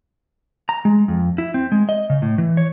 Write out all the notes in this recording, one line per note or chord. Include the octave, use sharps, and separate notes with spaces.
A#5
G#3
F2
E4
C4
G#3
D#5
C#3
A2
E3
C#5